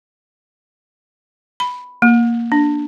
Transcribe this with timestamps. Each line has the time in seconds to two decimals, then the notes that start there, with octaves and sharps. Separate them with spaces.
1.60 B5
2.02 A#3
2.52 D4